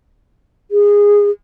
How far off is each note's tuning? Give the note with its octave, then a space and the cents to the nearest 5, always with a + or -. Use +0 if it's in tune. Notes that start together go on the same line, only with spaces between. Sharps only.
G#4 -15